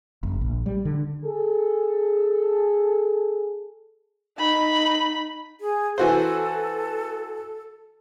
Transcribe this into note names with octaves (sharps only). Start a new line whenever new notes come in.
F#1
A#1
G3
D3
G#4 A4
D#4 B5
G#4
E3 F#4 A4 C5